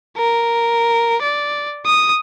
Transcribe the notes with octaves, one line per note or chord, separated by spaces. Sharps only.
A#4
D5
D#6